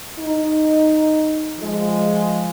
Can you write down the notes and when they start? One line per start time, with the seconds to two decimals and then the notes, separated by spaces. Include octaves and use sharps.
0.18 D#4
1.59 F3 G#3